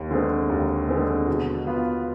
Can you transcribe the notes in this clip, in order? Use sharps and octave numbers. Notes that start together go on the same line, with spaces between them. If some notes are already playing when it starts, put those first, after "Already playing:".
Already playing: D#2
D3 G#3 C4
D#2
D3 G#3 C4
B2
B3 F4